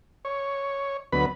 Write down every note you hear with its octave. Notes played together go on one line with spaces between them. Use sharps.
C#5
D2 F#3 B3 B4 B5